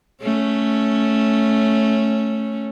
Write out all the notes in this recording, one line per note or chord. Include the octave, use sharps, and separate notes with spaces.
A3 C#4